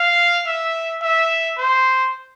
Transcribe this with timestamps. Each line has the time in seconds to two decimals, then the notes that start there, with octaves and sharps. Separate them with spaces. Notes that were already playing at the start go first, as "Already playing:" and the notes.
Already playing: F5
0.47 E5
1.02 E5
1.58 C5